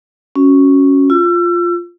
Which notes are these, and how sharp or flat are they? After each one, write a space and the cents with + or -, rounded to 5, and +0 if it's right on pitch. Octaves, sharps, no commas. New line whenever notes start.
C#4 +0 F#4 +0
F4 +0 E6 +35